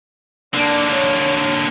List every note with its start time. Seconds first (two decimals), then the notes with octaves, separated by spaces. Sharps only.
0.54 D3 A#3 D4
0.92 C#5